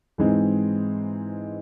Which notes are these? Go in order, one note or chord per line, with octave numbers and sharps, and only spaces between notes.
G#2 E3 G#3 C4 D#4